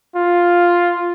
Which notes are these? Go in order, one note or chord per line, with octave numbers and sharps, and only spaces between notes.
F4